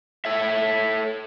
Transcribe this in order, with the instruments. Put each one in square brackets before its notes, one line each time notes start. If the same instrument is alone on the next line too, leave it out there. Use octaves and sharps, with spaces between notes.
[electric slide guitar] A4 C#5 E5